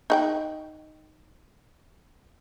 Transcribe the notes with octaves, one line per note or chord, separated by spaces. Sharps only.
D#4 F#5 G5